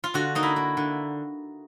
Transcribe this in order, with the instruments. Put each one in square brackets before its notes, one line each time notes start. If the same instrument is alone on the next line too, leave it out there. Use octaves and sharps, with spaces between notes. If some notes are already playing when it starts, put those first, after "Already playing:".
[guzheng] F4
D3 F#4
A#3 D#4
E4
A#3
D3